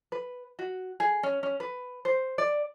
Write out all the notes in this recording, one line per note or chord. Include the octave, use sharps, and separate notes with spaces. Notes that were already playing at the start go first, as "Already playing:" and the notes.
B4
F#4
G#4
C#4
C#4
B4
C5
D5